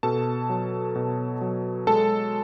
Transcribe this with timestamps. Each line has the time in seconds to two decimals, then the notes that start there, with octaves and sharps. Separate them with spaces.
0.03 B2 A4 A5
0.50 F#3
0.95 B2
1.41 F#3
1.87 G#3 A4 A5